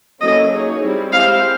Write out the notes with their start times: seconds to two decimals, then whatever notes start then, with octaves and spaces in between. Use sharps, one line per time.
0.20 F#3 A#3 C#4 E4 A4 D#5
0.52 A#3 D#4 G#4 C#5
0.83 G3 C4 E4
1.13 G#3 C4 E4 G4 C5 F5